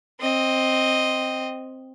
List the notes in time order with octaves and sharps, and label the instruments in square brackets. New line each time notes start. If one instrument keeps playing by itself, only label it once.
[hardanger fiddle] C4 D#5